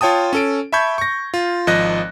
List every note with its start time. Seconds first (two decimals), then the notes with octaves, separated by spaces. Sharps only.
0.01 F4 C#5 G5 A5 D#6
0.33 C#4 A4 D7
0.72 E5 A5 B5 C#6 G6 G#6
0.98 C#6 A#6
1.34 F4
1.67 G#1 F3 D#5 F#6 A#6